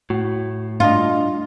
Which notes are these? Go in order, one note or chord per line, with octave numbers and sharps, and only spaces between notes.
A2 F#4
A3 D4 F4 D#5